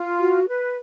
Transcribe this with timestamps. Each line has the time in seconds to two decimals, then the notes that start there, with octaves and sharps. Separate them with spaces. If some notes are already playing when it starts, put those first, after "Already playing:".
Already playing: F4
0.20 F#4
0.48 B4